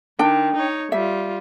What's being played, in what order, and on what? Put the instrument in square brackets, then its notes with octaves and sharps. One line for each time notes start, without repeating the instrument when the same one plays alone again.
[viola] D#3 [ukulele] D4 G5
[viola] D#4 C#5
[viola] G3 F4 [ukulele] E5